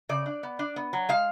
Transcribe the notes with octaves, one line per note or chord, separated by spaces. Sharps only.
C#3 D5
D4
B3
D4
B3
F#3
G#3 F5